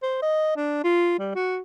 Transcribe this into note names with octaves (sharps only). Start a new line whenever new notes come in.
C5
D#5
D4
F4
G3
F#4